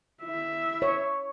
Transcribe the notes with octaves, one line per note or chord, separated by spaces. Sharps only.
E4 E5
C#5